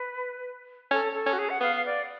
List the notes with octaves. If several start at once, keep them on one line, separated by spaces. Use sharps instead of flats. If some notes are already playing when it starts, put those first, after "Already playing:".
Already playing: B4
C#4 A4
A4
C#4
F#4
G#4
F#5
B3 F5
F5
D5